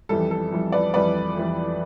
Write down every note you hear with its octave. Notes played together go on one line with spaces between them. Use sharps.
F2 E3 G3 A4
A4
F2 E3 G3
B4 D5
F2 E3 G3 B4 D5
F2 E3 G3